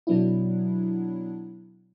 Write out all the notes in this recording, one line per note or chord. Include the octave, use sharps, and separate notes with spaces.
B2 F#3 B3 D4 E4